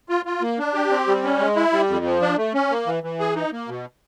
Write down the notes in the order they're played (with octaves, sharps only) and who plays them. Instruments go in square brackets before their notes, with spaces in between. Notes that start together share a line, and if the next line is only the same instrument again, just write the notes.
[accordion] F4
F4
A#3
D4
G4
C4
G3
C#4
G#3
E4
G3
F2
F3
D4
A3
C#4
A#3
E3
E3
G#4
D#4
A#3
B2